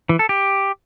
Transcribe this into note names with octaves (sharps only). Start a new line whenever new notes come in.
E3
A4
G4